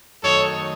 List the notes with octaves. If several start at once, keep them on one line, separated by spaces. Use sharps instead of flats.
F#2 D#3 A3 D#4 A4 C#5